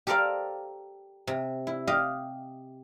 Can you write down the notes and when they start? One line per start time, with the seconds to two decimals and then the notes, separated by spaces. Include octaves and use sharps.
0.07 G4 A4 A#4 C5 D5 F5
1.27 C3
1.67 E4
1.87 G4 D#5 F5